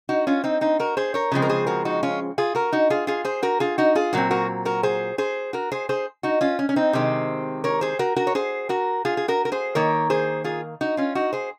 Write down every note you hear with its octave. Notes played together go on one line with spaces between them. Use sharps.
D#4 F#4
C#4 F4
C4 D#4
C4 D#4
F#4 A#4
G#4 C5
A#4 C#5
C#3 F3 G#3 C4
A#4
G#4 C5
F#4 A#4
D#4 F#4
C#4 F4
F4 G#4
F#4 A#4
D#4 F#4
F4 G#4
F4 G#4
G#4 C5
F#4 A#4
F4 G#4
D#4 F#4
F4 G#4
A#2 F#3 C4 F#4 A#4
F#4 A#4
F#4 A#4
G#4 C5
G#4 C5
F#4 A#4
G#4 C5
G#4 C5
D#4 F#4
C#4 F4
C#4
C#4
C4 D#4
C3 D#3 G#3 C4
A#4 C#5
G#4 C5
F#4 A#4
F#4 A#4
C#5
G#4 C5
F#4 A#4
F4 G#4
G#4
F#4 A#4
A#4
G#4 C5
D#3 A#3 A#4 C#5
G#4 C5
F4 G#4
D#4 F#4
C#4 F4
D#4 F#4
G#4 C5